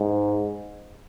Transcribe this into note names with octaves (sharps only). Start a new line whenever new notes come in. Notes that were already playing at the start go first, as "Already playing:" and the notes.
Already playing: G#2